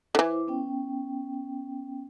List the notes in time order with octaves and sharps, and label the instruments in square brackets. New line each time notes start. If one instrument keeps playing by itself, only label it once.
[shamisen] D3 E3 [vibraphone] E4 C5 D6
[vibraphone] B3 C#4 G5